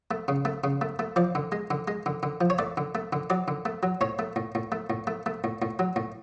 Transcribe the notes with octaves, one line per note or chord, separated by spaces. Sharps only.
A3
C#3
A3
C#3
A3
A3
F3 D5
D3
G#3
D3
G#3
D3
D3
F3
C#5
A3 D5
D3
A3
D3
F#3 D5
D3
A3
F#3
A2 C#5
A3
A2
A2
A3
A2
A3
A3
A2
A2
F#3
A2